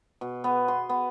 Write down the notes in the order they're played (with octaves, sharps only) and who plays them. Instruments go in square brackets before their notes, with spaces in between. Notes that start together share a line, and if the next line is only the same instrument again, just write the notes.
[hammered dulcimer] B2
B3
C6
B3